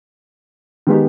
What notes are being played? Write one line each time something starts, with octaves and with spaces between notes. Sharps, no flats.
D#3 G#3 B3 D#4 G4